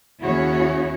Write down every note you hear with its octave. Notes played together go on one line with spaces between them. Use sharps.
D#2 C#4 E4 F#4 G#4 C#5